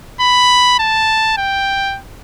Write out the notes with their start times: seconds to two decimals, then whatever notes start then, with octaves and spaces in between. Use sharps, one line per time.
0.21 B5
0.79 A5
1.38 G5